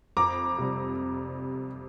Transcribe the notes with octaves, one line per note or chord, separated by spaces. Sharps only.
F2 A#5 D6
C3 G3